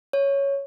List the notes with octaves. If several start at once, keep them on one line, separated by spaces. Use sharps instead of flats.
C#5